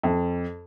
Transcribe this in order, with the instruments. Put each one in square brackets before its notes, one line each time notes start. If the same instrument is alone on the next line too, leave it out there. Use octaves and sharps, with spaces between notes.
[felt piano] F2